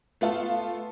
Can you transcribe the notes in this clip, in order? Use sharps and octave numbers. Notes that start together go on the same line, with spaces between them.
A3 B3 F4 A4